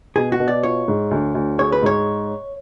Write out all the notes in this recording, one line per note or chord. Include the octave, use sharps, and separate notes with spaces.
B2 G#4
F#4
B2
D5
F4 C#5
G#2
D2
D2
G#4 C#5
B4
G#2 C#5